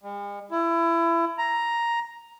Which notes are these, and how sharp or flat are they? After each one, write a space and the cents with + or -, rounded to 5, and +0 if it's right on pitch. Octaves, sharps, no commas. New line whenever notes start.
G#3 -45
E4 +25
A#5 +5